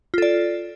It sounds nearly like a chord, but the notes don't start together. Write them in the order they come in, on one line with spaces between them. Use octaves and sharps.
F4 A4 D5